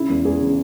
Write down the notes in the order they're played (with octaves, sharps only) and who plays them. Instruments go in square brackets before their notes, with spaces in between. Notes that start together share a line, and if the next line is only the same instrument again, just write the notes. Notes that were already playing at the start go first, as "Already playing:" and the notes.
Already playing: [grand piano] C#3 E4
E2
E2 G#4
C#3